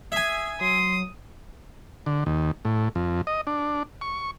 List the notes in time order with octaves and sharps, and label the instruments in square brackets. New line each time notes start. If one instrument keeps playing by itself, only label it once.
[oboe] G#4 [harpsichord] E5 G#5
[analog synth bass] F#3 [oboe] C6 [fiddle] D#6
[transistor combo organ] D3
D#2
A2
F2
D#5
D4
C#6